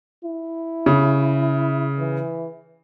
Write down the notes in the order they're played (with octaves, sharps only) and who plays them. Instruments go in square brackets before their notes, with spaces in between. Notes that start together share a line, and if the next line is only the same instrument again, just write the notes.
[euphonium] E4
[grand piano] C#3
[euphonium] E3